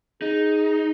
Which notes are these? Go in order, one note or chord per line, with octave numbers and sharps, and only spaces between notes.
D#4 G#4